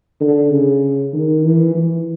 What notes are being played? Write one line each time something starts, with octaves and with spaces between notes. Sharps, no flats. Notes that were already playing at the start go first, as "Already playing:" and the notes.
D3
C#3
D#3
E3
E3